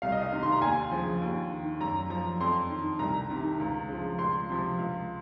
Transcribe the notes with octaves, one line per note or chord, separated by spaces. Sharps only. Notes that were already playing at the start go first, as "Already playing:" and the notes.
C2 F5
D#5
F5
C3 D#3
C6
A#5
D#2 G#5
C#3 F3
D#2
D#3
F#2 A#5
F3 A#5
F2 C6
D#3
C2 A#5
C3 D#3
C#2
C#3 F3
C#2 C6
C3 F3
C#2